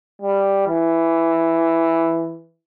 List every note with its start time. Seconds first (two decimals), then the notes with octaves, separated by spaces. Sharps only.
0.21 G3
0.68 E3